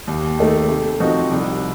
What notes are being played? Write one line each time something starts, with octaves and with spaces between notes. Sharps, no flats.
D#2
D#3 A3
C3
F3 C4 D#4 F#4
C2